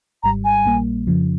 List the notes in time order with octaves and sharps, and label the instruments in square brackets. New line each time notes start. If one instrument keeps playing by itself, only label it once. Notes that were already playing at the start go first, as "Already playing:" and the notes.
[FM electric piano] G#1 G#2 G3 [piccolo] A#5
[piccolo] G#5
[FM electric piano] A#1 A#2 G3 A#3
F2 C#3 F3